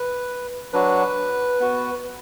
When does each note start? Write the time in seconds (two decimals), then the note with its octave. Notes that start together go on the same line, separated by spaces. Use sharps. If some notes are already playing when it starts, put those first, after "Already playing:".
Already playing: B4
0.73 F#3 D4 F#4 B4
1.60 B3 F#4